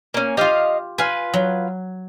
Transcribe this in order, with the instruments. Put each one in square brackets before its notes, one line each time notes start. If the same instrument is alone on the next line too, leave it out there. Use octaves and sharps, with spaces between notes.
[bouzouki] A#3 C#4
[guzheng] F4 G4 [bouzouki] D#5 F5
[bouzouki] F4 B4 [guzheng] G#5
[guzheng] F#3